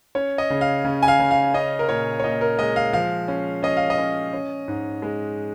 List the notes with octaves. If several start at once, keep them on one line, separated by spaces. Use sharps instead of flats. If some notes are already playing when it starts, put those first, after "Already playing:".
C#4 C#5
D#5
C#3
F5
C#3
G#5
F5
C#3
F5
C#4 D#5
A#4
A#2 C#5
C#5
A#2 D#5
A#4
G#3 D#5
F5
F3 F5
C#4
C#4 D#5
F5
D#5
C#4
C#4
G#2
G#3